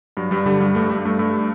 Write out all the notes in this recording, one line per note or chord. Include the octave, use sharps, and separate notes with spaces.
G2 F#3
G2 G3
D3 G3
G2 G3
G2 A3
G2 G3
G2 A3
G2